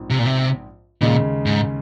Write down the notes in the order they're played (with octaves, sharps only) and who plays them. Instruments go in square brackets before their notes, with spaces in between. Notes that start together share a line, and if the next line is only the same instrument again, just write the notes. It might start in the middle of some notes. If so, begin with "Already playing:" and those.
Already playing: [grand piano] A#1 G#2 F3 C4
[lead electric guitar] C3
A#2
C3
[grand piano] D#2 C#3 G#3 D#4 G#4 [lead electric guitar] A#2
[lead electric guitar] G#2